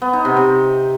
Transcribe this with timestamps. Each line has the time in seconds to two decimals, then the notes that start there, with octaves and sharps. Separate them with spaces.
0.02 B3
0.13 D#4
0.25 C3
0.37 C3